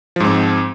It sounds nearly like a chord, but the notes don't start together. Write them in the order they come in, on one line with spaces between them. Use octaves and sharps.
F3 G#2 C4